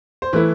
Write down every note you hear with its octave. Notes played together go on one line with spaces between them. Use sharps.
C5
E3 A3 E4 B4